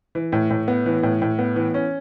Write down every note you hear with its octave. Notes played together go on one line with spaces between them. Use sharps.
E3
A2
A2
B3
E3
A2
A2
B3
E3
C#4